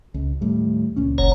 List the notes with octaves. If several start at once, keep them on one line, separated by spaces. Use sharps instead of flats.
C#2
D#2 A2 G3
C#2 A#2 C#4
F#1 C#5 A#5